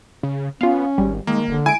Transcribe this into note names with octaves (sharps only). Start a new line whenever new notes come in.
C#3
B3 C#4 F4 F5
G#1 G3
D#3 G#3 A#3
F1 D3
G#3 E4 G#5 D7